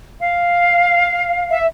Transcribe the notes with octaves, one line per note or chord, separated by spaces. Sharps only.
F5
E5